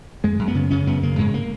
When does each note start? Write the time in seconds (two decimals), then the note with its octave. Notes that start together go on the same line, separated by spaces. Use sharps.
0.24 F#2 G#3
0.39 F#2
0.48 B3
0.55 C#3
0.71 C#3 C#4
0.87 F#2 B3
1.03 C#3 A#3
1.18 G#2 G#3
1.34 A#3